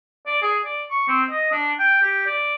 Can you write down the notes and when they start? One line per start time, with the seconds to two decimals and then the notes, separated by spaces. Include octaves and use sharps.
0.26 D5
0.42 G#4
0.64 D5
0.90 C#6
1.08 C4
1.30 D#5
1.51 D4
1.79 G5
2.02 G4
2.26 D5